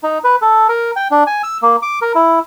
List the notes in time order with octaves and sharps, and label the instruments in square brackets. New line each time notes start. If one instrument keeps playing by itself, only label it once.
[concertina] D#4
B4
A4
A#4
G5
D4
G#5
E6
A#3
D6
A#4
E4